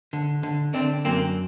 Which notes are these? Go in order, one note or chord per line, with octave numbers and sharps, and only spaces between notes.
D3
D3
D3 C4 D4
F#2 A#3 C4